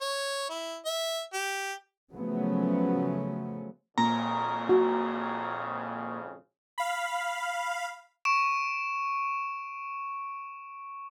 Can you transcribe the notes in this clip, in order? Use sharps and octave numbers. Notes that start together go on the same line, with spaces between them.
C#5
E4
E5
G4
C#3 F3 F#3 A3 B3 C#4
G#1 F2 A#2 C#3 A#5
F#4
F5 B5
C#6 D7 E7